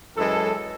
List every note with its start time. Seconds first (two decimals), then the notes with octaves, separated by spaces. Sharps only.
0.17 F#2 E3 G#3 A4